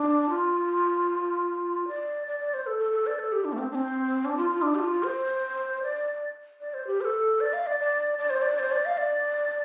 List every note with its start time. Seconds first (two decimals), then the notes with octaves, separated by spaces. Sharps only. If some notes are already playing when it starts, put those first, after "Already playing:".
Already playing: D4
0.29 F4
1.88 D5
2.27 D5
2.39 D5
2.54 C5
2.66 A4
2.79 A4
2.93 A4
3.06 D5
3.19 A4
3.32 G4
3.45 D4
3.53 A3
3.58 C4
3.71 D4
3.75 C4
4.25 D4
4.37 F4
4.50 F4
4.62 D4
4.75 G4
4.79 F4
5.03 C5
5.83 D5
6.61 D5
6.74 C5
6.87 G4
7.01 C5
7.05 A4
7.40 D5
7.53 F5
7.67 D5
7.79 D5
8.19 D5
8.30 C5
8.42 D5
8.59 C5
8.72 D5
8.86 F5
8.98 D5